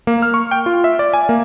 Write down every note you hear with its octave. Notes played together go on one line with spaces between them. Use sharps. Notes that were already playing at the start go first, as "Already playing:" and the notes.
A#3
F6
C#6
G5
F4
E5
D5
G#5
A#3